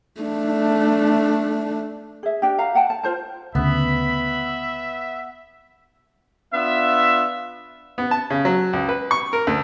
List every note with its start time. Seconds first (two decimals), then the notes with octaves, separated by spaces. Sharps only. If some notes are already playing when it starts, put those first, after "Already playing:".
0.21 A3 D4
2.23 G#4 E5
2.42 D4 G4
2.58 F#4 F5 A#5
2.75 F#5 G5 A5
2.90 A5
3.03 F4 C5 A5
3.55 D2 C#3 B3 E5 B5
6.53 B3 D4 F4 E5
7.98 B3
8.11 A5
8.30 C#3
8.45 F#3
8.73 C#2
8.89 B4
9.11 C#6
9.33 A#4
9.47 D2